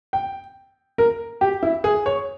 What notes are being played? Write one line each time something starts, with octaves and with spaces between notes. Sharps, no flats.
G5
A#4
G4
E4
G#4
C#5